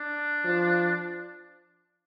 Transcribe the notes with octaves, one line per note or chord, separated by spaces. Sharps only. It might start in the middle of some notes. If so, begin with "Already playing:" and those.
Already playing: D4
F3